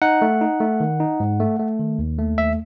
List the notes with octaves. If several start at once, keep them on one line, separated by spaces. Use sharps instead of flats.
D#4 F#5
A3
D#4
A3
D#3
D#4
G#2
A3
A3
D#3
D#2
A3
D#2 E5